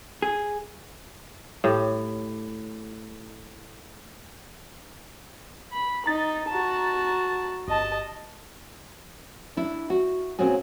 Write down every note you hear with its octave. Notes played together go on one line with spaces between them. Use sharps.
G#4
A2 G4
B5
D#4 A#5 A6
F#4 A5
G1 D#5 A5
D4 E4
F#4
A#2 C4 C#4 F#4 G#4